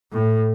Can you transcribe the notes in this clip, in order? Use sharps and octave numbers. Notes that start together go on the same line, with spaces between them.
A2